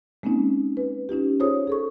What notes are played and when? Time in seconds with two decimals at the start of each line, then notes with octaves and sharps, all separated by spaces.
0.23 G#3 A#3 C4 C#4 D#4
0.77 B4
1.09 C#4 D#4 F4 G4
1.40 F4 G#4 C5 C#5 D#6
1.67 G#4 A4 C#6